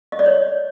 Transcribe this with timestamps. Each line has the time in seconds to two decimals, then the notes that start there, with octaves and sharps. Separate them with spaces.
0.12 D#5
0.19 D5
0.26 C#5